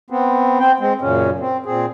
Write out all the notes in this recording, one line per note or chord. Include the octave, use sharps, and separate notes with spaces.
B3 C4
C4 G5
G#3 C4
F#2 A#2 C#3 C#4
C4
A#2 C4 G#4